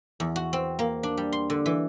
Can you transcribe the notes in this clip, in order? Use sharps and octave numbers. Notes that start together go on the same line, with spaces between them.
E2
F#4
C4
A#3
D4
G3
C6
D3
E3